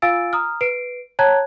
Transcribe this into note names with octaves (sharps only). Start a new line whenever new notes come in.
F4 F5 G#5 E6 A6 D7
A#5 D#6 F6
B4 C7 D7
C#5 G5 A5 A#5 F#6 G#6